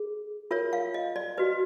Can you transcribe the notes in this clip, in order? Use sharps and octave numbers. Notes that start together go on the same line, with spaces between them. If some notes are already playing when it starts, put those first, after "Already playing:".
Already playing: G#4
F4 A#4 C#5 E5
F5
D#5
D5
F#4 B4 D#5